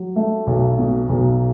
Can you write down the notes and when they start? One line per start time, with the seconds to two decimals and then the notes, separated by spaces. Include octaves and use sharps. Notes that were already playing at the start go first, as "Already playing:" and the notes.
Already playing: F#3
0.16 A3 E5
0.47 B1
0.78 B2
1.09 B1